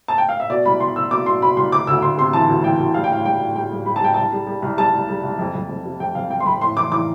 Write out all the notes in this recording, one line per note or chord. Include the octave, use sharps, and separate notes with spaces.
A5
G5
F5
E5
B2 D5
C2 B5
C2 C6
C2 E6
B2 D6
B2 C6
B2 B5
C2 C6
D2 D6
D2 E6
D2 C6
C3 C6
E3 A5
D2
E3 G5
D2
G3 F5
G5
A2 F5
G3 G5
A2
G3 G5
G3
G3 B5
A5
G3 G5
C2 A5
G3
G3
C2
G3 A5
C2
G3
C2
F2
F2
F2
C3
F2 G5
F2 F5
F3 G5
C6
F2 B5
A2 C6
E3 D6
E3 D6